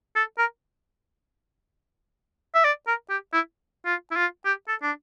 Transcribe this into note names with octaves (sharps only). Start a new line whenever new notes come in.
A4
A#4
E5
D5
A#4
G4
E4
F4
E4
F4
G4
A4
D4